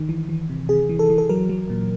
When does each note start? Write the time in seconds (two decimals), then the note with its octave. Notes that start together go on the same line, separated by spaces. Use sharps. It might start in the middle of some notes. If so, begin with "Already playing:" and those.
Already playing: D#3
0.09 E3
0.29 E3
0.49 C3
0.69 C3 G#4
0.89 E3
0.99 A4
1.10 E3
1.18 A4
1.29 F#3 A#4
1.49 F#3
1.70 A#2